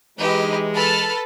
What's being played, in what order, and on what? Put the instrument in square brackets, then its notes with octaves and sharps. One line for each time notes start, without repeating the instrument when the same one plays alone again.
[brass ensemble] E3 G#3 [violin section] D#4 B4 [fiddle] G4 D#5
[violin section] A4 B4 A5 [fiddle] B5 F6